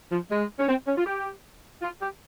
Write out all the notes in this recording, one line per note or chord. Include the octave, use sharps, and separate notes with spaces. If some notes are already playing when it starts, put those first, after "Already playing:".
F3
G#3
C#4
C4
C#4
F4
G4
F4
G4